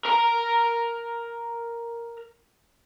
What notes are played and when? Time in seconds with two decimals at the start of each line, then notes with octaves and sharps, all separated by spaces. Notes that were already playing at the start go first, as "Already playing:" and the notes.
0.05 A#4 A#5